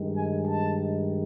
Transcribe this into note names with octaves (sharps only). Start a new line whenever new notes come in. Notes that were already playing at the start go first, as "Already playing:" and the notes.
Already playing: G2 D#3 G#3
G#5
A5